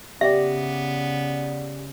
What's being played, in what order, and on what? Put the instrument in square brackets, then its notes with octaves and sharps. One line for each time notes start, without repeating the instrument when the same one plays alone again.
[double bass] C#3 [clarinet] B3 [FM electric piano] G4 D5 [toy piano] E5